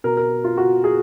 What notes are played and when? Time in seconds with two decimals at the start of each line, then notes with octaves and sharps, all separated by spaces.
0.04 B2 A#4
0.17 A#4
0.44 F4
0.57 F#4
0.84 G#4